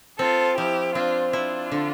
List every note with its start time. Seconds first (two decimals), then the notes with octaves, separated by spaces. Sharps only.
0.19 C4 F4 A4
0.57 F3 E4 G4
0.95 C4 D4 F4
1.33 D4 E4 F4
1.72 D3